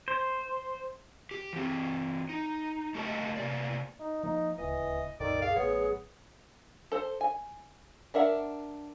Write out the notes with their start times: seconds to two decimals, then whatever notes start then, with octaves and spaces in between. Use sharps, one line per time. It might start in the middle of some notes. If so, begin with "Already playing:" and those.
0.08 C5
1.31 G4
1.53 E3 C4
2.29 D#4
2.95 A3 G4 A#4 D#5 A5
3.36 C3 A#3 D5
4.00 D#4
4.23 F3 A#3 D#4
4.58 D1 C#2 E3 D#5
5.20 C2 F#2 A#2 D#3 A4 D5
5.42 G#4 F5
5.56 A1 F#3 B3 G#4 C#5
6.92 A4 C5
7.21 G#5
8.14 D4 A#4 E5 F#5